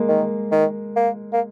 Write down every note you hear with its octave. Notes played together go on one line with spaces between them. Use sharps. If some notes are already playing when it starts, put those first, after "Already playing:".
Already playing: G#3 A#3
D#3
D#3
A#3
A#3